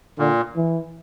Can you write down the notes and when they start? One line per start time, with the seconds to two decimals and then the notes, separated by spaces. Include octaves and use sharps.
0.18 A#2 D3
0.56 E3